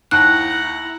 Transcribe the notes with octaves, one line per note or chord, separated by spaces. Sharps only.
D#2 E4 F#5 A#5 F#6